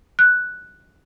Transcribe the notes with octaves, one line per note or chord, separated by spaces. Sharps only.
F#6